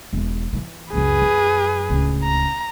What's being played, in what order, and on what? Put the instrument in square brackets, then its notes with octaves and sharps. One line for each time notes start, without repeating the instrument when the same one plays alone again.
[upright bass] E1 E2
D#3 E3
[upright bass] C#2 F#2 [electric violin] G#4 B4
[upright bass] F#2
D1 C#2
[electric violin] A#5